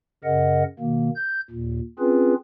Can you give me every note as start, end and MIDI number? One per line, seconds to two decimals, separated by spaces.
0.24 0.64 42
0.24 0.64 49
0.24 0.64 70
0.24 0.64 75
0.24 0.64 78
0.80 1.10 47
0.80 1.10 51
0.80 1.10 58
1.16 1.41 91
1.50 1.80 39
1.50 1.80 46
1.99 2.34 60
1.99 2.34 61
1.99 2.34 65
1.99 2.34 68
1.99 2.34 71